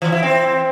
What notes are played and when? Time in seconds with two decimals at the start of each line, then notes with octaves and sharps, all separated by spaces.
0.02 E3
0.12 E4
0.23 C4